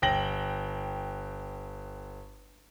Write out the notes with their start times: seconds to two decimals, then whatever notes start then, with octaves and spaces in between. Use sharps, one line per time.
0.02 G1 G5 A#6 F#7